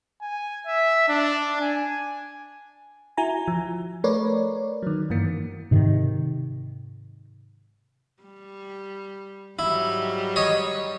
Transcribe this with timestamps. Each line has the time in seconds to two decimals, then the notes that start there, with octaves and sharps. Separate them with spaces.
0.22 G#5
0.66 E5
1.09 D4
1.61 G#5
3.17 E4 F#4 G#5 A#5
3.48 F3
4.04 A3 A#4 B4 C#5 D5
4.83 D#3 F#3
5.10 G2 E3 A#3
5.71 G#2 C3 D#3
8.22 G3
9.59 G#2 F#3 G3 E4
10.36 C#5 D#5